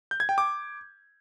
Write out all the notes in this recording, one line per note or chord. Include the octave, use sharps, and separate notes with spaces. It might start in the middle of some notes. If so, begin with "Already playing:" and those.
G6
G#6
G5
D6